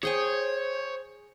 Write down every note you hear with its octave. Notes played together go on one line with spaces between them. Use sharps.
G#4 C5 C#5 G5 G#5